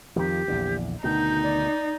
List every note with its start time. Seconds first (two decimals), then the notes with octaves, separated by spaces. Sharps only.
0.16 F2 D#3 F3 G4
0.48 A#1 E2 D3
1.04 D2 B2 D#3 D#4 G6
1.43 D5